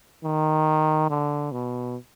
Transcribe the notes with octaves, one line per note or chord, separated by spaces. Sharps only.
D#3
D3
B2